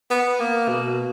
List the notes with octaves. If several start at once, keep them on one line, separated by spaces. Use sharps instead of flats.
B3
A#3
B2